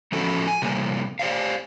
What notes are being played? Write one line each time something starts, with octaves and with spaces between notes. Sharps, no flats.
F3 A3 C#4 E4 F#4 A4
G#5
C3 G3 A3 A#3
G4 C5 D5 F5